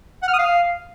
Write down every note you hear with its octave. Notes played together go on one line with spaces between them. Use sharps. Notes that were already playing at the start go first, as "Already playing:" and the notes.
F#5
F6
D#6
F5